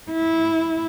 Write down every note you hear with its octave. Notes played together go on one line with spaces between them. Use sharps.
E4